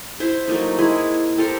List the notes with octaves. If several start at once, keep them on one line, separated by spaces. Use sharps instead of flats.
E4 C5 E5
F#3 A3 A#3 D#4
G#3 E4 G#4
G4 A4 A#4 C5